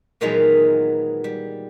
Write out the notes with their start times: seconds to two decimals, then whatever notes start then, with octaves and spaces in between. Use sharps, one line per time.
0.21 A#2 D#3 E3 F#3 G#3 B3
1.24 G3